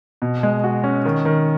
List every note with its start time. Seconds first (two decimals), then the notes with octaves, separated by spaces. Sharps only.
0.22 B2
0.43 G#3
0.64 F#4
0.84 C#4
1.05 D#3
1.25 D#3